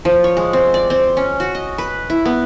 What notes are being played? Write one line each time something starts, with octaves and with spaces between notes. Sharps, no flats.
F3
C#5
G#3
C4
D5
C4
C#4
F#4
D#5
B4
E4
B3